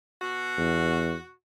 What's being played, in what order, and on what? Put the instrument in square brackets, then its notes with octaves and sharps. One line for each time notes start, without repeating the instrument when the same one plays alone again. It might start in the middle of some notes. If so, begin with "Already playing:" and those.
[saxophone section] B2 F#4
[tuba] E2